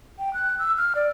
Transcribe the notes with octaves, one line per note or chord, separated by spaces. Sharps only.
G5
F#6
E6
F6
D5